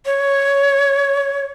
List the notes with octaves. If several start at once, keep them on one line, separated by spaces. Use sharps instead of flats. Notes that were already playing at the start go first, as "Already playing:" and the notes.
C#5